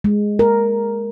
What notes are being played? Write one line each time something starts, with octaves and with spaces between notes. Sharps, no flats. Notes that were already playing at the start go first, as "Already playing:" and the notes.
G#3
A#4